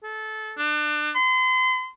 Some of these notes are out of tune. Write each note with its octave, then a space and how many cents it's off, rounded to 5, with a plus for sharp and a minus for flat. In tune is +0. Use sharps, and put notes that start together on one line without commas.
A4 -20
D4 +30
C6 -35